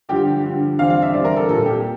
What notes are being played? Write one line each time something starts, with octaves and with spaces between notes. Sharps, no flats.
G2 D3 F3 G4
G2 D3 F3
E2 D3 G3 C4 F5
F5
E5
E2 D3 G3 C4 D5
A#4
A4
A#2 G3 A#3 A4
G4